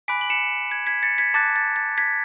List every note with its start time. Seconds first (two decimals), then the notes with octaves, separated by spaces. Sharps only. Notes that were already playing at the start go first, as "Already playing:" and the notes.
0.08 G#5 B5 D6 F#6 B6 D7
0.21 F#7
0.30 C#7 E7
0.72 G#6
0.87 G#6 B6
1.03 A6 C#7
1.18 G#6 B6
1.34 A5 D6 F#6 A6
1.56 A6
1.76 A6
1.98 G#6 B6